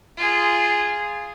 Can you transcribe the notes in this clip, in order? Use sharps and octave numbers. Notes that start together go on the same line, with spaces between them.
F4 G#4